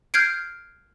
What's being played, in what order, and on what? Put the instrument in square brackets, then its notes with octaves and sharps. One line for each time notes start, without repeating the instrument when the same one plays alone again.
[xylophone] F6 G6 G#6 C7 D7